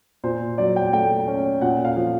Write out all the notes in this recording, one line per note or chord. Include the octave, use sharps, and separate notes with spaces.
A#2 C5
F#3 D5
G5
A3 G5
C#4
A#2 F#5
F5
F3